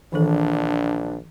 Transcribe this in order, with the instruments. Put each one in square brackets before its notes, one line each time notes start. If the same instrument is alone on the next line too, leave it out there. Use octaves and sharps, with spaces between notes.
[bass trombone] A#1 [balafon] D#3 E3 A4 [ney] D4